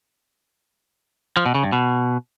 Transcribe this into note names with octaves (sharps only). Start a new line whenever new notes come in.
F3
B2
C#3
G2
B2